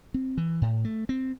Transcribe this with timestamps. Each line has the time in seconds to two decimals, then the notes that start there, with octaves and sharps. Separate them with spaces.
0.14 C4
0.37 E3
0.62 A2
0.85 A3
1.09 C4